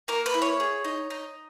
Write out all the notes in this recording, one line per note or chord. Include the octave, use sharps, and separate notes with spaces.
A#3 A#4
B4
E4
C#5
G#4
D#4
D#4